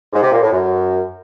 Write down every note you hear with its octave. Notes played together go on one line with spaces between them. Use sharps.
G#2
C3
A#2
A2
F#2